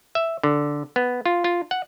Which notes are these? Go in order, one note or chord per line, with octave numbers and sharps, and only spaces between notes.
E5
D3
B3
F4
F4
F#5